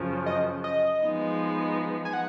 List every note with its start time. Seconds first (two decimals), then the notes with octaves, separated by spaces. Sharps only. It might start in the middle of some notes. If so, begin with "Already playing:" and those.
Already playing: F#2 C#3 F3
0.26 D#5
0.64 D#5
1.02 F3 G#3 B3 D#4
2.05 G#5
2.13 F#5